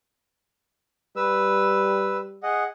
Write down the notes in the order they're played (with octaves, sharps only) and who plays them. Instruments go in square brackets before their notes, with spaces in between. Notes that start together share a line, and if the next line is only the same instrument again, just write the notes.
[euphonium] G3 [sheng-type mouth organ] B4 E6
[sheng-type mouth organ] G#4 D#5 F#5